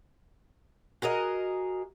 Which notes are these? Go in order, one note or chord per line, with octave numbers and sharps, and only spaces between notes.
F#4 G#4 A#4 D#5